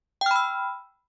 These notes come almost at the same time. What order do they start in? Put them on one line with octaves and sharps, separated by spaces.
G5 F6 B5 E6